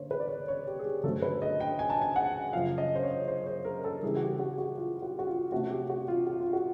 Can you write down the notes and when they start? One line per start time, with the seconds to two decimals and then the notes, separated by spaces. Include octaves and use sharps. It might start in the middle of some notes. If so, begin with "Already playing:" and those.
Already playing: D3 A#3 C5 C#5
0.11 B4
0.20 D5
0.29 C#5
0.48 C#5
0.67 G4
0.79 G#4
0.85 G4
1.04 G2 D3 F#3 A3 C4 A4
1.22 B4
1.42 D#5
1.60 G5
1.79 G#5
1.90 A5
2.02 G#5
2.16 F#5
2.53 F#2 C#3 F3 F5
2.78 D#5
2.95 C5
3.03 C#5
3.28 C5
3.47 C5
3.65 A#4
3.84 A4
4.03 C#3 E3 G3 G#4
4.16 F#4
4.21 G4
4.39 F#4
4.58 F#4
4.77 F4
5.02 F#4
5.19 F#4
5.27 F4
5.52 C3 F3 A3 C#4 F#4
5.70 G4
5.90 F#4
6.08 F4
6.27 F#4
6.40 F4
6.53 F#4